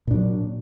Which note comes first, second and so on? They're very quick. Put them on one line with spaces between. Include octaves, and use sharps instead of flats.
A#2 D4 F#3